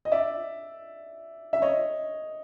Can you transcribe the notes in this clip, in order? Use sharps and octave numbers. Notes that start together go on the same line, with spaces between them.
D#5
D5 E5
E5
C#5 D#5